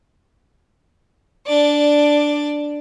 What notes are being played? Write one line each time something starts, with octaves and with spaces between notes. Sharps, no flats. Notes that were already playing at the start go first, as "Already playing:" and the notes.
D4 D5